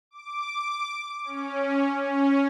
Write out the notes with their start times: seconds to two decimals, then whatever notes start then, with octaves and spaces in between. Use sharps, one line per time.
0.11 D6
1.24 C#4
2.05 C#4